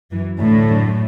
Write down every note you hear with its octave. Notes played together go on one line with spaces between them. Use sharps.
F#2 E3
D2 A2 D3 A3
F#2 D3